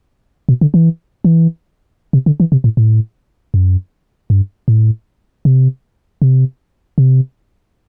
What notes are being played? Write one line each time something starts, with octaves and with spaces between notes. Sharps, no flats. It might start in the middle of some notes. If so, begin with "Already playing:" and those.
B2
D3
E3
E3
C3
D3
E3
C3
A2
A2
F#2
G2
A2
C3
C3
C3